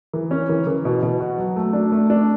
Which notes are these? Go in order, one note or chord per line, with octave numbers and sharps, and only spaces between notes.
E3
C#4
E3
E3
B2
B2
F#4
F#3
A3
D4
A3
D4